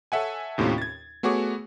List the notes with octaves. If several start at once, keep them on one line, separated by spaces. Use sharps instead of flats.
A4 C#5 E5 F#5 G#5
D#2 A2 C3 C#4 D#4 F4
G#6 A6
A3 B3 F#4 G#4 C#5 D6